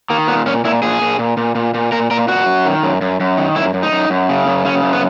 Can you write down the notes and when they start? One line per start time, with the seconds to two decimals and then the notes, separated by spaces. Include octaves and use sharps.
0.10 D#3 A#3
0.28 A#2 B3
0.46 A#2 C#4
0.64 A#2 E4
0.83 A#2 G#4
1.02 A#2
1.19 A#2
1.37 A#2
1.55 A#2
1.74 A#2
1.92 A#2 A#4
2.11 A#2 A#4
2.28 A#2 F#4
2.46 F#2
2.65 D#3
2.83 F#2
3.01 F#2
3.20 F#2
3.38 D#3
3.56 F#2 E4
3.74 F#2
3.83 D#4
3.92 F#2
4.10 F#2
4.29 C#3
4.47 F#2
4.65 C#3 C#4
4.83 F#2
4.93 B3